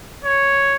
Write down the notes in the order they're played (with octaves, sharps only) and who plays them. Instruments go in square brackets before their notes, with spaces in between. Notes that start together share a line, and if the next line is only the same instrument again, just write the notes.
[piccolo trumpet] C#5